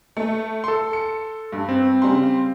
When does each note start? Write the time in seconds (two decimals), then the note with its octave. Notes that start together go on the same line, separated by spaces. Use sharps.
0.17 A3
0.64 A4 C6
0.93 C#7
1.52 G2
1.69 C4
2.02 C#3 G3 C6